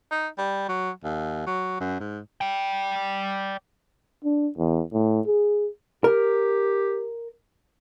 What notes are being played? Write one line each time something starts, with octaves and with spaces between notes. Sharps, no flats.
D#4
G3
F#3
D#2
F#3
F#2
G#2
D5 G5
D4
E2
A2
G#4
G4 A#4